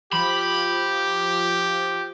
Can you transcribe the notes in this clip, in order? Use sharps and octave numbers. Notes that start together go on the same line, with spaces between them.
F3 G4 B5